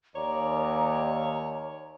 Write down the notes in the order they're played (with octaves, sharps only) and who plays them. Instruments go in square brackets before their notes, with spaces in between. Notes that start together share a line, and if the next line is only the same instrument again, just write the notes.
[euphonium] D#2 [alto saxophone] C#5 [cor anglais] D5 [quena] A#5